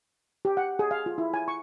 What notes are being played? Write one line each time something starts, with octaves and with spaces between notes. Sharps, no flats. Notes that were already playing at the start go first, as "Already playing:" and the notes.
G4
F#5
G#4
F5
F4
E4
G#5
C#6